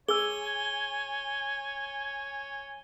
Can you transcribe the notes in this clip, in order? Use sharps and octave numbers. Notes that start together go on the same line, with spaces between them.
G#4 C#5 G#5 E6 G7